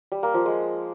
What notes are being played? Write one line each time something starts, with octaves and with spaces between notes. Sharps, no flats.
G3
A#3
F3
G#3